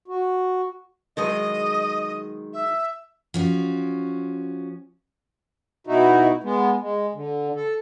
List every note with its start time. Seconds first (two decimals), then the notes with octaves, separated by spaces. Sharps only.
0.08 F#4
1.17 D#3 F#3 G#3 D#5
2.53 E5
3.34 F3 C#4 F#4
5.87 B2 D#4 E4 F#4
6.44 G#3 B3
6.81 G#3
7.14 D3
7.56 A4